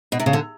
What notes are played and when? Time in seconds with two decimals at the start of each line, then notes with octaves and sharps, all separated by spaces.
0.12 B2
0.20 C3
0.26 C#3
0.33 D3